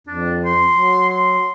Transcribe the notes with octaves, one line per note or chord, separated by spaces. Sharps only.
F2 D4
C6
F#3
C6